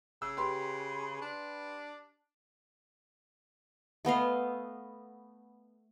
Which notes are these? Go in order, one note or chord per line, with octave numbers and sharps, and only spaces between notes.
C#3 E6
G4 B4 C6
D4
A3 B3 D#5 F5